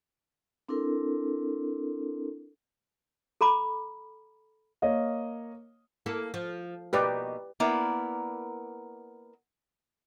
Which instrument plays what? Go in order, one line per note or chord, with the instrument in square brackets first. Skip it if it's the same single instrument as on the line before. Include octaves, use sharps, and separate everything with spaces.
[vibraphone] C4 D4 E4 A4 A#4
[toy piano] A4 A#5 B5 D6
[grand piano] A#3 C#5 D#5 F5
[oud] A#3 E4 A4
F3
[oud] B2 A#3 D#4 [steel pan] G4 B4 D5
[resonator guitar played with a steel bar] A#3 B3 E4 A#4 D5